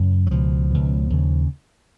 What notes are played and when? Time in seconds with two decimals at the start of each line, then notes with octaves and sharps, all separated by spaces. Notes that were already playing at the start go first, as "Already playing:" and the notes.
Already playing: F#2 C#3
0.27 F#3
0.31 C#2 B2 F3
0.71 C#2 B2
1.10 D#2 C#3